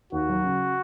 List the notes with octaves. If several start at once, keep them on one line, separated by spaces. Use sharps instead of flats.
D#2 F#4
F#3
C#3